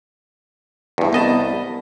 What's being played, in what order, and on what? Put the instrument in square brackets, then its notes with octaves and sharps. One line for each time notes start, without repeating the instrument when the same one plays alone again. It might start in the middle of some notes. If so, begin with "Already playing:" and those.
[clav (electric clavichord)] E2 G2
[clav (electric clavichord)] C2 D#5 A5 [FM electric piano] B3 A#4 B5